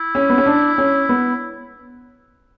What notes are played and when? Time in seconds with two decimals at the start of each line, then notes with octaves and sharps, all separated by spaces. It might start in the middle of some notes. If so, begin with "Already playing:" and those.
Already playing: E4
0.15 C#4
0.30 B3
0.38 C#4
0.46 D4
0.78 C#4
1.09 B3